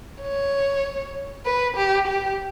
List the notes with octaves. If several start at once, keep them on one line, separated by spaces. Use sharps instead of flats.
C#5
B4
G4
G4